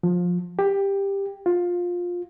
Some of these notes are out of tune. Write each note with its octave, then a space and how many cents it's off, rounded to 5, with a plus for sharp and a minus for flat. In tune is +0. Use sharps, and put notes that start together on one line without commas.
F3 +20
G4 +10
F4 +15